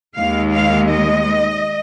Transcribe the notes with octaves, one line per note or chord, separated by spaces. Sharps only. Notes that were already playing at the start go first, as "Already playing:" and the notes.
D#2 D#3 G#3 F5
F5
D#5